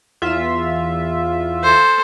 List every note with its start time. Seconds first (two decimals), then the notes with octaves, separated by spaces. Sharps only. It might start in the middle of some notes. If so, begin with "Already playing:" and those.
0.22 E2 F4 E5
1.63 A4 C5